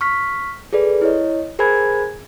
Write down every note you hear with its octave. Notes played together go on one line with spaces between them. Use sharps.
C#6 F6 B6
G#4 A4 B4 D5
E4 C#5 D#5
G#4 A#4 C5 G#5 B5 G#6